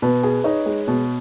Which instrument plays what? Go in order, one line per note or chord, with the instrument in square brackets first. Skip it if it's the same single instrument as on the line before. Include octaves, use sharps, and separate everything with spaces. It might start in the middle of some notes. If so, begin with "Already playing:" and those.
[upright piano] B2 [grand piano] B4
[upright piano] G#4
[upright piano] D#4 [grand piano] C#5
[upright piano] G#3
B2